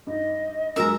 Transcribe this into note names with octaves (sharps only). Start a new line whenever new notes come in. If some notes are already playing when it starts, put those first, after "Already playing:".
G2 D#4 D#5
G2 F#3 G#3 A#4 E5 A#5